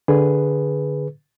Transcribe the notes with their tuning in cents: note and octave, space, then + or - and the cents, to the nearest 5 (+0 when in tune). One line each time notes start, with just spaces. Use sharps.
D3 +0 G#4 +0 B4 +0